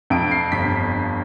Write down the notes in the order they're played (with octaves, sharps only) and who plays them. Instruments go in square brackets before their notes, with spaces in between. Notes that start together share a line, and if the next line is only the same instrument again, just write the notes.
[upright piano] F2 D7
C7
G1 B6